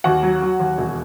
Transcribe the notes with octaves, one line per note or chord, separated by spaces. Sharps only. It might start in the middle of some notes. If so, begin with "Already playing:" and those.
D#2 F#4 F#5
F#3
F#3
D#2
E1